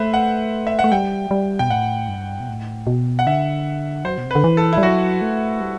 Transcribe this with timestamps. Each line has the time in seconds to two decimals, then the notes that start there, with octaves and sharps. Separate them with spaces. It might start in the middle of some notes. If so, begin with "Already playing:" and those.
Already playing: A3 B4 C5 E5
0.14 F#5
0.67 E5
0.79 F#5
0.84 A3
0.92 G3 G5
1.31 G3
1.59 B2 G5
1.69 A2 F#5
2.08 G2
2.40 B2
2.49 A2
2.87 B2
3.19 F#5
3.26 D3 E5
4.05 F#3 C5
4.18 B2
4.26 C3
4.31 B4
4.35 D3
4.44 E3
4.57 A4
4.73 E4
4.78 G3
4.83 F#3 F#4
5.22 A3
5.61 G3